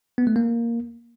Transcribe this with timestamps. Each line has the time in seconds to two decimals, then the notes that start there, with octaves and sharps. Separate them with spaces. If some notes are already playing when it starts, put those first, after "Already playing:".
0.18 B3
0.27 A3
0.36 A#3